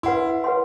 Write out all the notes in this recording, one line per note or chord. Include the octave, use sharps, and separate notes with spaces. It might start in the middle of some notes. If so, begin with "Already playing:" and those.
E4 B4 F#5 C6
B4 F#5 C6